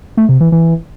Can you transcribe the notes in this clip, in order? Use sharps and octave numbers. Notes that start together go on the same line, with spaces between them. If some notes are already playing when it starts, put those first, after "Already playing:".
A3
C3
E3
E3